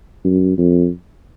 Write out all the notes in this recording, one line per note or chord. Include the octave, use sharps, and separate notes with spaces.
F#2
F2